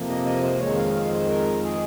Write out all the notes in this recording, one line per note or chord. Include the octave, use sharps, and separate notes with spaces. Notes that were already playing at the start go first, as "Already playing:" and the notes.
Already playing: F2 C3 F3 A#3
D#5
D#5
C5
F2 D#3 G#3 C#5
F5
F5
C5
A#4
G#4